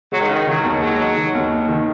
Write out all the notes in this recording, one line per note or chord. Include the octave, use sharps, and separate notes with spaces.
F#3 G#3
D#3
C#3
D#3 D#4
D#3 F#3
D#2
F#3 G#3
D#4
D#3
D#2
D#4
D#3